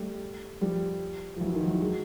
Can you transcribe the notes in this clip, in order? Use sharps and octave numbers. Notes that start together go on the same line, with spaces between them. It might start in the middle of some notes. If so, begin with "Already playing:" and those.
Already playing: G3 A3
F3 G3
F3
E3 F#3
D#3 F3
E3 F#3
F#3 G#3